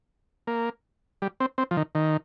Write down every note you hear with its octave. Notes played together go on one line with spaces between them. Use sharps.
A#3
G3
C4
C4
F3
D#3
D#3